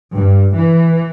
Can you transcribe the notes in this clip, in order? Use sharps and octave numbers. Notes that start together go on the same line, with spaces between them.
G2
E3